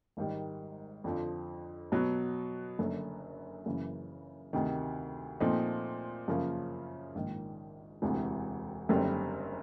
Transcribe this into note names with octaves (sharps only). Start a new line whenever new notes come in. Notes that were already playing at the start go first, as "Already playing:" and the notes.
G#1 G#2 D#3 G3
F2 D3 F3
B2 F#3 B3
F#1 F#2 D3
F#1 F#2 C#3 E3
D2 C3 D#3
A#2 F3 A3 C4 D#4
F#2 C#3 F3 A#3 C#4
A#1 G#2 D#3
E1 D2 C3 E3
F#1 F#2 D3 G3 C4